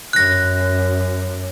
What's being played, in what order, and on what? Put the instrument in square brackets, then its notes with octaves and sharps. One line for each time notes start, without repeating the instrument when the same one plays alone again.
[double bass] F#2 [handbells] F#6 A#6